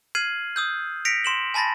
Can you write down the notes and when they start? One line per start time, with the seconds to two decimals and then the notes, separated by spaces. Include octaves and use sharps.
0.15 F6 G#6 C7 D#7 F#7
0.56 D#6 E6 G6
1.05 A#6 B6 C#7 D7 F7
1.25 C6 E7 F#7
1.54 G#5 A5 B5 A6 A#6